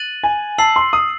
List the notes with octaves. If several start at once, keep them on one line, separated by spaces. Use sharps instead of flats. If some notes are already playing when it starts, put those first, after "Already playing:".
Already playing: F#6 A6 D#7 F#7
G#5
A5 E6 C7 F#7
C6
D#6